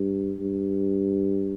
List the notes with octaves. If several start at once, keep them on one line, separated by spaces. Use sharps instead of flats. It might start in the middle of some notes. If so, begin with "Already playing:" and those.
Already playing: G2
G2